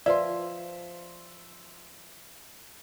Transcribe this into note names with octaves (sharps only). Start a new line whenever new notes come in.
F3 B4 D5 E5 C6